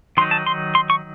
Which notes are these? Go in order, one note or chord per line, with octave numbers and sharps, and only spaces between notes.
D#3 F#3 D#4 C6
A5
C6
C6
C#6